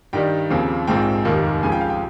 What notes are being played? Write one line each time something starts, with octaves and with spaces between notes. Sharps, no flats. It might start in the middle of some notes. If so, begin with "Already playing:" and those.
G2 D#3 G3 G5
D#2 C#3 F3 C4
A#1 G#2 F3 G#3 C4 G5
F1 D#2 D#3 A#3
C#2 C#3 F3 G#5
G5
F5
G5